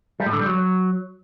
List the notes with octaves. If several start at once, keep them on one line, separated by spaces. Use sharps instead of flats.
G3
A2
D3
G3
F#3